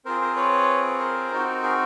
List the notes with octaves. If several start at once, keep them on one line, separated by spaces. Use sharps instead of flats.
C4 F4 G#4 A#4 C5
A#4 C5
B4 C#5
A#4 C5
C4 D#4 F#4
G#4 A#4